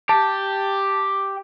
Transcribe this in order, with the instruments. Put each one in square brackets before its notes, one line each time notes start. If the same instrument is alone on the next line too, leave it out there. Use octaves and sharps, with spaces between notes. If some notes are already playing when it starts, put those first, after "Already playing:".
[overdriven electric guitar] G4 [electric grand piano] A5